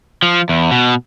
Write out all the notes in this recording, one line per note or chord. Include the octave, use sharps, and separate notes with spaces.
F3
E2
B2